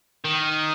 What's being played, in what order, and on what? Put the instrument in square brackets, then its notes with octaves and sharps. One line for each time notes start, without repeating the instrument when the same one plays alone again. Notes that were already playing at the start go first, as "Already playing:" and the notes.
[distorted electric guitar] D#3